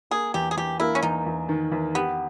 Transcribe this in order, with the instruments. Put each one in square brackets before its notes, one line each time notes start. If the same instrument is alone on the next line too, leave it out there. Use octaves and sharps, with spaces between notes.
[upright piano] A#3 [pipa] G#4
[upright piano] E2 [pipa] G4
[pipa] G#4
[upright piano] E2 [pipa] G4
[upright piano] A#3 [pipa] E4
[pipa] C#4
[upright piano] E2 [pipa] D#4
[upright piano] E2
D#3
E2
[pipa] B3 [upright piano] G4